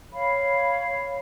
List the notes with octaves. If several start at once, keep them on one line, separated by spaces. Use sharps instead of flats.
C#5 F5 B5